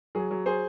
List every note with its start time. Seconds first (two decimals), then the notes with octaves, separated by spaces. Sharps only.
0.15 F#3 G#4
0.31 F#3
0.46 G#4 C5